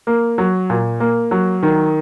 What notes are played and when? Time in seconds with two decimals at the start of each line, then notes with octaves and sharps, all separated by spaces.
0.07 A#3
0.38 F#3
0.70 A#2
1.00 A#3
1.31 F#3
1.63 D#3